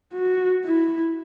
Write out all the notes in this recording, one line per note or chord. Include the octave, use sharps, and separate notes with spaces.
F#4
E4